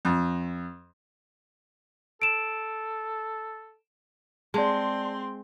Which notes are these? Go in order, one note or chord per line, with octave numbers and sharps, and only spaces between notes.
F2
A4 D7 E7
G#3 C4 D5 A5 C6